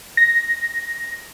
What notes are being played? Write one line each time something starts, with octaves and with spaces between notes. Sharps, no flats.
A#6